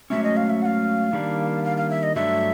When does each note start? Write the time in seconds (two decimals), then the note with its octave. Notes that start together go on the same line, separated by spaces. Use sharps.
0.10 G#2 D#3 F#3 A3 C#4 E5
0.24 D#5
0.37 F5
0.50 E5
0.62 F#5
0.66 F5
1.13 D#3 G3 A#3 D4
1.65 F5
1.77 F5
1.90 E5
2.03 D#5
2.15 G2 D3 F#3 A3 D4 E5